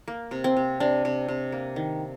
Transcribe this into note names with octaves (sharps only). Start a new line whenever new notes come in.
A#3
C3
C4
C3
C3 D4
C3
C3
A#3
D#3